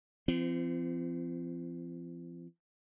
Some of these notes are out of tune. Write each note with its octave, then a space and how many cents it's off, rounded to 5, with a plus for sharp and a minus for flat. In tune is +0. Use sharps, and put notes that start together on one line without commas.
F3 -40 C4 -15